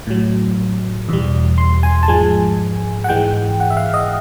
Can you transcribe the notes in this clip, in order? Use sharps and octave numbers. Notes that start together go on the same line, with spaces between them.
A2 F#3
E2 B2 G3
C6
G#5
A5
G#2 F3 G#3 G#5
F#5
G#2 E3 G#3 G5
F#5
E5
F5
D#5